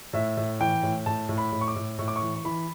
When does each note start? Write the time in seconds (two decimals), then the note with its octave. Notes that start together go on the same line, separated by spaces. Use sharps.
0.13 A2 E5
0.37 A2
0.60 E3 G5
0.83 A2
1.06 A2 A5
1.29 A2
1.38 B5
1.52 A2
1.61 C#6
1.68 D6
1.76 A2
1.99 A2 C#6
2.08 D6
2.16 C#6
2.22 E3
2.36 C#6
2.45 E3 B5